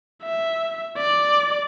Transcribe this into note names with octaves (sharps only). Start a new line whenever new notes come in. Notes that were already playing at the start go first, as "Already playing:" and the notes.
E5
D5